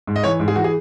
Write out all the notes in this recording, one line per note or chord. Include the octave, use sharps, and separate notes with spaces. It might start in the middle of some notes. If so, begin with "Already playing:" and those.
G#2
D#5
E3 C#5
G#2
G#4
E3 F#4
G#4